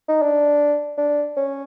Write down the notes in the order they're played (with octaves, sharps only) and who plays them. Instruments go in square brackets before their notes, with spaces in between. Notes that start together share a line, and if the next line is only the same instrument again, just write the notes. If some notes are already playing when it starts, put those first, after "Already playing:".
[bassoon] D#4
D4
D4
C#4